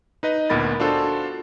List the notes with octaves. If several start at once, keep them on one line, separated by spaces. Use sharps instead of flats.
D#4 B4 D#5
D2 A#2 B3 A#4 B5 A6
D4 F4 F#4 A4 C5